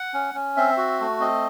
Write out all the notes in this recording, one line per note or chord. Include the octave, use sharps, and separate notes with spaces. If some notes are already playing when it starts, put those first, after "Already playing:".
Already playing: F#5
C#4
C#4
C4 E5
F#4
A3
C4 D#5